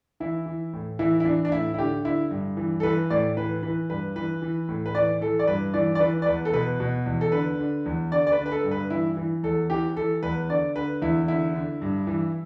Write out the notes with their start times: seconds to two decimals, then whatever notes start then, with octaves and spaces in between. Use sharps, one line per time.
0.20 E3 E4
0.46 E3
0.73 A2
0.99 E3 E4
1.20 E4
1.25 E3 D4
1.45 D4
1.52 A2 E4
1.74 E4
1.78 D3 G4
2.05 D3 E4
2.31 G2
2.57 E3
2.80 A4
2.83 E3 B4
3.10 A2 D5
3.37 E3 B4
3.62 E3 B4
3.90 G2 B4
4.16 E3 B4
4.42 E3
4.69 A2
4.86 B4
4.95 E3 D5
5.21 E3 A4
5.39 D5
5.47 G2 B4
5.74 E3 D5
5.95 D5
6.00 E3 B4
6.22 D5
6.26 E2 B4
6.45 A4
6.53 B2 B4
6.80 B2
7.06 E2
7.21 A4
7.32 D3 B4
7.59 D3
7.86 E2
8.12 D3 D5
8.27 D5
8.32 B4
8.38 D3
8.46 B4
8.52 A4
8.64 G2
8.71 B4
8.90 E3 E4
9.17 E3
9.43 E2 A4
9.70 E3 G4
9.96 E3 A4
10.23 E2 B4
10.49 D3 D5
10.76 D3 B4
11.02 E2 E4
11.28 D3 E4
11.55 D3
11.82 G2
12.07 E3